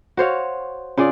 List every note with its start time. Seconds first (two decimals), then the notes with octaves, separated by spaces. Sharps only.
0.17 F#4 C5 C#5 F5
0.97 C#3 F4 G#4 D5